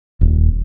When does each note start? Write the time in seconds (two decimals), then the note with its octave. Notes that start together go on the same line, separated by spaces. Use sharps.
0.21 D#1